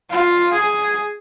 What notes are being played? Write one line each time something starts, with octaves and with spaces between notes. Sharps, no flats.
F4
G#4